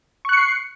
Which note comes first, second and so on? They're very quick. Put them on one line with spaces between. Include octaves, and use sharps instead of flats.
C#6 F#6 C#7 C7